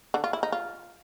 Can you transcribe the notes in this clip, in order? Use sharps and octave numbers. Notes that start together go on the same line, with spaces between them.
D3
F4
E4
D#4
F4